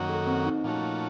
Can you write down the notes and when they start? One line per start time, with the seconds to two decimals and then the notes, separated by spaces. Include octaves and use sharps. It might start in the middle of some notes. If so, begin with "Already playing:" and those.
Already playing: F#2 D#3 A#3 C#4 F#4
0.09 A4
0.27 C4
0.46 D#4
0.64 A#2 F3 A3 C#4 F#4